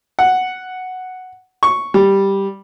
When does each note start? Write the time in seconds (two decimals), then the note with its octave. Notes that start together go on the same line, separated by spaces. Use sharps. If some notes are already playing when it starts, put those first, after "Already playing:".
0.19 F#5
1.63 C#6
1.94 G3